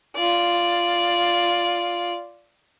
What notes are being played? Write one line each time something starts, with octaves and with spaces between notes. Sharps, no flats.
F4 D5